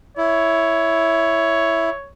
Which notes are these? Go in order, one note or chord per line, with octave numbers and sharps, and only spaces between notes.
E4 C#5